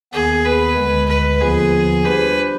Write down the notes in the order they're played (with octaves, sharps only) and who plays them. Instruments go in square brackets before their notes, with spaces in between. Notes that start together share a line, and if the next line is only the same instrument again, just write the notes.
[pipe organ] D#2 D#3 B3 [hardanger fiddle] G#4
[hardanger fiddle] B4
[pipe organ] D2 D3 G#3
[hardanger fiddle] B4
[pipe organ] D#2 D3 F3 B3 F4 [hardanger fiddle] G#4
[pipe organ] G3 D4 G4 C5 [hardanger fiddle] B4